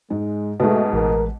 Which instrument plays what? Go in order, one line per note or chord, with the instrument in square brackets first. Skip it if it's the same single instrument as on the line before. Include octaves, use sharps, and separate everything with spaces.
[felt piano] G#2 [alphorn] G#3
[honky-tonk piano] G#2 B2 [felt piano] G#3 B4 [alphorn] A3
[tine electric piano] A1 [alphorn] A#4